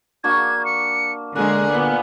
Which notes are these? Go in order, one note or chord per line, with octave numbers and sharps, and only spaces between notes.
A#3 D4 F#4 G#6
C#7
D3 G#3 A#3 G#4 D5 F#6
A#2 B3 G#5